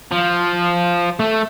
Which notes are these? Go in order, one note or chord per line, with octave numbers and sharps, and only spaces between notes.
F3
A3